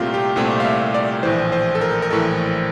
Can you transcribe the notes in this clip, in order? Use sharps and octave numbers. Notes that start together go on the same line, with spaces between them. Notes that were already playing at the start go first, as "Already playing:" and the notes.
Already playing: C2 A#2 A3 C4 F4 G4 A#4
G4
C2 A#2 A3 C4
F5
E5
D5
A#1 A2 E3 C5
C5
A4
A#4
A#4
A#1 A2 E3 A4